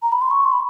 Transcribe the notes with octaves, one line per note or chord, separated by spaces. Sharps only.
A#5
B5
C6
C#6
C6
B5